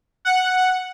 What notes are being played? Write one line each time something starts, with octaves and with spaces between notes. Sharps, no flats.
F#5